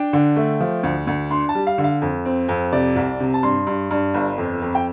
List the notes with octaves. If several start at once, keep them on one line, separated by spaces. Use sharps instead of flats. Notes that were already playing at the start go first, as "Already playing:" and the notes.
Already playing: D4 G5
D3
A3
F3
D2
D2
D4 C6
A5
G3
F5
D3
F5
F2
C4
F2
C3 D5
C2
C3
A5
G2 C6
G2
G2
G1
F2
F2
G5